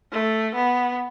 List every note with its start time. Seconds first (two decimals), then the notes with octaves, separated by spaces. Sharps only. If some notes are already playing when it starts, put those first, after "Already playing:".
0.12 A3
0.55 B3